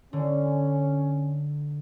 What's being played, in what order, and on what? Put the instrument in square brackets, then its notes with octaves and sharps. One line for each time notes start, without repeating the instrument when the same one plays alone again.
[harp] D3 [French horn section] C#4